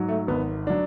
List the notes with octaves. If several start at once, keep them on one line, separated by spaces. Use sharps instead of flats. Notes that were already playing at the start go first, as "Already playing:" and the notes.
Already playing: G#2 F#3
A3
G#1 B3
F#3 D4